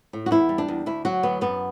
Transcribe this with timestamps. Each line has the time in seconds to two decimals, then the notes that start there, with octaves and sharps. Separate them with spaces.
0.13 A2
0.26 F#4
0.31 E2 E4
0.49 G3
0.58 D4
0.68 E2
0.86 D2 E4
1.05 F#3 F#4
1.23 D2 B3
1.41 F#2 B3